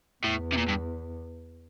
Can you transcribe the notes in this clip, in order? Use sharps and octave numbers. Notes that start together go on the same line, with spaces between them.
E2 A2
C3
A#2
G2